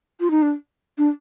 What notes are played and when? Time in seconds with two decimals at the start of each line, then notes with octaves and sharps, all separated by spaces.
0.20 F4
0.31 D#4
0.42 D4
0.98 D4